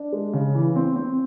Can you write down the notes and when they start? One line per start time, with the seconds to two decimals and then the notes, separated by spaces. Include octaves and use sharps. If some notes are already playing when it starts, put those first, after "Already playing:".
Already playing: D4
0.12 G#3
0.33 C#3
0.55 E3
0.76 C4
0.96 C4